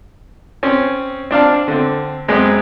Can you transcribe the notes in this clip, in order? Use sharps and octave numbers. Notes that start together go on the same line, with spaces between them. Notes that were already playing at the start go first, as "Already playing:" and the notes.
C4 C#4
C4 D4 F5 A5
D3 C4
F#2 G#3 B3 C4